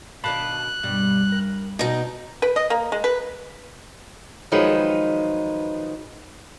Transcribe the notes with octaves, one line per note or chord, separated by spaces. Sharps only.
B2 D#3 D4 F5 A5 B5 F#6
G2 B2 G3
A#4
B2 D#4 D#5 A#5
B4
D#5
A#3
G#3
B4
D#3 F3 F#3 G#3 D#4 B4